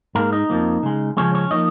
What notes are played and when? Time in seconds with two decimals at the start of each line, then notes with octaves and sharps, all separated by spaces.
0.15 G#2 G#3 A#3 A#4
0.32 D#4 D#5
0.50 F2 F3 A#3
0.83 C#3 G#3
1.17 C#3 F3 G#3 C#4 C#5
1.34 C#4 C#5
1.51 F3 A#3 D#4 D#5